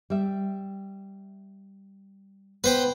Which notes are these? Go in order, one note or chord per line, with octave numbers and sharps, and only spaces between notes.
G3 E5
B3 B4 C5 G5